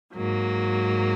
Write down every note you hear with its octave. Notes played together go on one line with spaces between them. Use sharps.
G#2 F#3 A#3